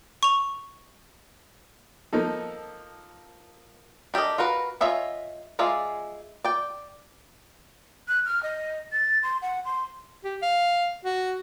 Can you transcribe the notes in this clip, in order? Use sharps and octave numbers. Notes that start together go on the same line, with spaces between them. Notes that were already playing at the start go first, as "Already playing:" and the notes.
C#6 F7
F3 A#3 D#4 A4
D4 G4 A4 A#4 D#5
F4 F#4 A#4 B4
F4 C#5 D#5 E5 G#5
G#3 F4 G#4 D5 E5
D5 G5
F#6
F6
D#5
A6
C6
F#5
C6
G4
F5
F#4